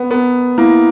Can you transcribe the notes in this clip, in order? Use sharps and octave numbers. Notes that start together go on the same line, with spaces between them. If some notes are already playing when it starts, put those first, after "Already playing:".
Already playing: B3
B3 A#4
A#3 E4